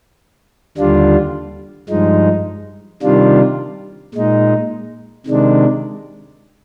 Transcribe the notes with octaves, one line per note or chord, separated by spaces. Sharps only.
D#2 D3 G3 D4 F4
G2 F3 G#3 D#4
C3 D#3 G3 D4 F4
A#2 G#3 D#4
C3 D#3 G#3 D4